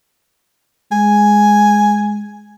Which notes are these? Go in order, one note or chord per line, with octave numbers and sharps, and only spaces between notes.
G#3 G#5